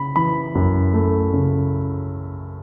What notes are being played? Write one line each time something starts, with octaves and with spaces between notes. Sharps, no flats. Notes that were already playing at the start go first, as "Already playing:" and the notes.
Already playing: C#3 B5
E3 B5
F#2
A3
C#3